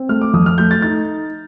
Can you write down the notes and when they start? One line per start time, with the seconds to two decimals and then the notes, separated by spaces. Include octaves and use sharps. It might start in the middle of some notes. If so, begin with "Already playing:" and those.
Already playing: C4
0.09 A3 F6
0.21 D6
0.33 F2 D#6
0.46 F6
0.58 A3 G6
0.71 A6
0.82 D#4 A6